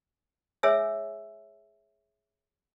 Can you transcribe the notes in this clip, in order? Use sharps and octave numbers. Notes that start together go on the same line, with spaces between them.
G#4 C#5 E5 G#5 E6